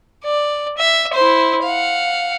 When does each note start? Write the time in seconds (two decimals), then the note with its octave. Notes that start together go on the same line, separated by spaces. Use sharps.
0.25 D5
0.78 E5
1.14 E4 C5
1.63 F5 F#5